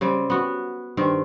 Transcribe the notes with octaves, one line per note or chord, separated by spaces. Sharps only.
C#3 G3 C4
B3 F#4
G2 D#3 C4